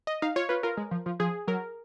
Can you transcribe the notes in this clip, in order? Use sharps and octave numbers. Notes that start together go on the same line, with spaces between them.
D#5
D#4 F5
F4 C#5
F4 B4
F4 A#4
G#3
F3
F3
F3 G#4
F#3 A#4